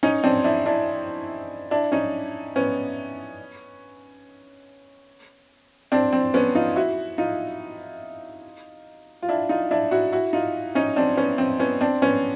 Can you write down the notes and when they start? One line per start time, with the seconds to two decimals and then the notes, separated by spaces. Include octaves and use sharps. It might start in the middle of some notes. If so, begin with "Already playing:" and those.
0.03 C#4 D#4
0.24 C4 D4
0.44 D4 E4
0.66 D4 E4
1.71 D4 E4
1.92 C#4 D#4
2.56 B3 C#4
5.92 C4 D4
6.13 C4
6.34 B3 C#4
6.55 D#4 F4
6.76 E4 F#4
7.18 D#4 F4
9.23 F4
9.28 D4 E4
9.49 D#4 F4
9.71 D4 E4
9.91 E4 F#4
10.12 E4 F#4
10.33 D#4 F4
10.75 C#4 D#4
10.96 C4 D4
11.17 B3 C#4
11.38 C4
11.59 B3 C#4
11.81 C4 D4
12.02 B3 C#4